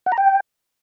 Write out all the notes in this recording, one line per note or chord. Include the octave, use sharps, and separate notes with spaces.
F#5
A#5
G5